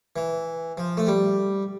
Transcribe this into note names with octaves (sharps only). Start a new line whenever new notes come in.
E3
F3
A3
G3